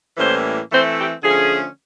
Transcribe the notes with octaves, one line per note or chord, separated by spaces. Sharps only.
A2 E3 G3 A#3 C#4 C5
E3 A3 C4 C5
G4
D3 F3 A3 C#4 G#4